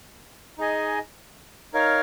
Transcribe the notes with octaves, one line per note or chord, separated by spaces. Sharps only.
D#4 G#4 D#5 G#5
D#4 A#4 C#5 F5